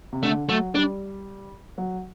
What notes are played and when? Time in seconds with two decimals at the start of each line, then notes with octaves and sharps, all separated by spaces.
0.13 C3
0.23 D3 A3
0.49 F#3 A3
0.75 G3 D4
1.78 F#3